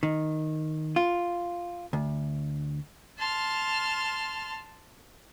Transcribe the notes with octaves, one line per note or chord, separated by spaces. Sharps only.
D#3
F4
D2
A5 C6 F6